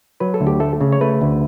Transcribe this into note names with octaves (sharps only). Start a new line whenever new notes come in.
F#3 B4
A4
D2
G4
A3 A4
C#3
C#5
A3 B4
D2